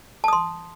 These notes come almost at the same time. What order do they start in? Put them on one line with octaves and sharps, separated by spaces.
A5 D#6 C6